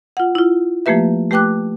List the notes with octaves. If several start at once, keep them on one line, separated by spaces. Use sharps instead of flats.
F4 F#5
E4 F4
F3 A3 A#3 G4 B4 E5
A3 G4 B4 G5 D6 F#6